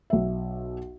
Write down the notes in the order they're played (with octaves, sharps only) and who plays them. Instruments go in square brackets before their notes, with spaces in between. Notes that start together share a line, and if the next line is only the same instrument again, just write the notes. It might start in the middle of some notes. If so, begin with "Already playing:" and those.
[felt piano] B1 E5